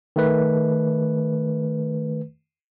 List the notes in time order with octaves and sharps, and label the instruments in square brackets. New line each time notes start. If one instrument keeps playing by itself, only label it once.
[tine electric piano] D#3 A3 B4